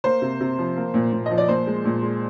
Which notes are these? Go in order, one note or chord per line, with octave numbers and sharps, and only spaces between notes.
A#3 C5
C3
C3
F3
A#3
A#2
A#2
F3 D#5
D5
A#2 C5
G#3
A#2
G#3